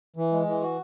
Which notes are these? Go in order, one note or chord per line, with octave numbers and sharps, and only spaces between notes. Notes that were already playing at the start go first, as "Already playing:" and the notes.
E3
G#3
E3
F#4